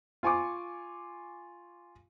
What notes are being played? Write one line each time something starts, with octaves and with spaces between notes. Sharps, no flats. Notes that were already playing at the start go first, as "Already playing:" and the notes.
F4 G#5 C#6 D6